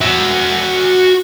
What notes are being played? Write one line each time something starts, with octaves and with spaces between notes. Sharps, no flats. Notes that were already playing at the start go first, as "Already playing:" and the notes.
F#4 E5